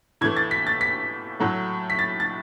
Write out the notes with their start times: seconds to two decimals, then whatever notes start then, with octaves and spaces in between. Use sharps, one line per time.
0.21 A2 E3 A3 G#6
0.37 A6
0.51 B6
0.67 A6
0.81 B6
1.40 A2 F#3 A3
1.90 B6
1.99 A6
2.20 A6